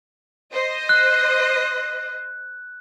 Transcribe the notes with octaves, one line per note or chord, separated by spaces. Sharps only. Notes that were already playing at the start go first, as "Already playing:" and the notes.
C5 D#5
F#6